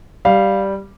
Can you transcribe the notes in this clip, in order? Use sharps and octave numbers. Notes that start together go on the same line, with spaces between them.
G3 F5